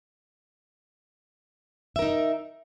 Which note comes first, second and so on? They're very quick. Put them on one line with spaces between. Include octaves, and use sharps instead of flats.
E5 A#4 D#4